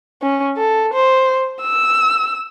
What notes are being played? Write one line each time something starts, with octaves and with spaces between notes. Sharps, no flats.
C#4
A4
C5
E6